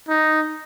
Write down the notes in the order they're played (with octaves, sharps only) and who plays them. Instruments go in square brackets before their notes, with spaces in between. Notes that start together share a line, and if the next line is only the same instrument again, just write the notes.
[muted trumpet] D#4